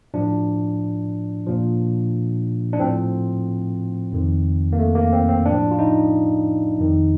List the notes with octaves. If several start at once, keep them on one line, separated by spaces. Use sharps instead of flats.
A2 F3 D4
A#2 F3
D4
A2 F3 C4
F2 D#3
A#3
A3
A#3
C4
C4
A2 F3 D4
F4
D#4
F2 D#3